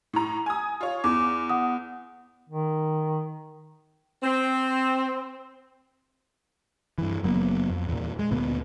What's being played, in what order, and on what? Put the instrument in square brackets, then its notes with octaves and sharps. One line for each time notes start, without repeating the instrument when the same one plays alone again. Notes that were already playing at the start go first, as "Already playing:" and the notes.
[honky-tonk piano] A2 A#5
G#5 D#6
F4 C#5
[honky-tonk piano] E2 [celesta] D6
[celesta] F#5 D#6
[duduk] D#3
[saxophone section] C4
[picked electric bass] G2 E3
F#1 F#3 A#3 B3
F2
E2 A#2
G#3
D2 A#2 B3